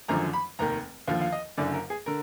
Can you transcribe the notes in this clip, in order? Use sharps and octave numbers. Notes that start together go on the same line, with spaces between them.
G#1 F#2 D3 F3 A#5
B5
F1 D#2 D#3 A#5
D#2 D3 F3 F5
F5
D#5
F#1 F#2 D3 D5
A#4
G#4
D3 A#4